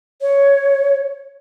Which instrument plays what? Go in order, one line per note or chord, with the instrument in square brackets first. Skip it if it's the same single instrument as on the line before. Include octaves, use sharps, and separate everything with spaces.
[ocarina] C#5